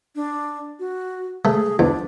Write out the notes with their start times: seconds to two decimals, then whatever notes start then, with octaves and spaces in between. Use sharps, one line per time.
0.15 D4
0.80 F#4
1.45 A3 G#4
1.79 E2 D4